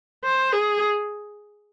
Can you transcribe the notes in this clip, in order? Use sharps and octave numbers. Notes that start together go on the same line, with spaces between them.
C5
G#4